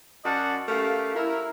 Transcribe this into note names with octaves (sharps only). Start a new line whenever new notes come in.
F#2 F#4 D5 D#5 F#5 A5
A3 C#4 G4 A#4 F5
E4 A#4